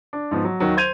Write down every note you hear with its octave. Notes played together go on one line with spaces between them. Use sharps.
D4
G#2 F3 B3
F#3
D#2 D#3 F#3
C5 G6 G#6 D#7 F7